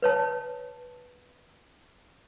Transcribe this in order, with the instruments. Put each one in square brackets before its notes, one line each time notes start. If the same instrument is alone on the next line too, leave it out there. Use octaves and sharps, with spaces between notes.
[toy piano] B4 C#5 A5